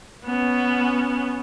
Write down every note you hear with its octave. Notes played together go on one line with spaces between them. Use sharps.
B3 C#4